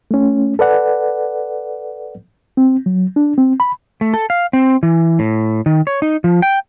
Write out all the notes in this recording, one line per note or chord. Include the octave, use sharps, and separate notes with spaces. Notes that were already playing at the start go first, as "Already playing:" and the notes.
A3 C#4
A4 B4 D5 F#5
C4
F#3
D4
C4
B5
A3
A4
F5
C4
E3
A2
D#3
C#5
D#4
F3
G5